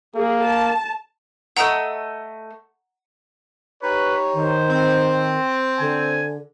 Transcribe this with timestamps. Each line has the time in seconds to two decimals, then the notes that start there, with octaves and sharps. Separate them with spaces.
0.16 A#3 G#4
0.46 A5
1.57 A3 D#5 F#5 A#5 E6 D7
3.83 D#4 G4 B4 C#5
4.33 D#3 C5
4.69 C4
5.79 D3 G#5